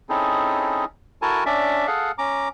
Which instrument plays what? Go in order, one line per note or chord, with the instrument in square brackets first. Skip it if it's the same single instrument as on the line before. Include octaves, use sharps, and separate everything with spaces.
[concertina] C4 C#4 D#4 E4 G#4 A4
E4 F#4 A4 A#4 G#5 A5
C#4 D4 D5 E5
G#4 A4 F5 F#5
C#4 A#5 D6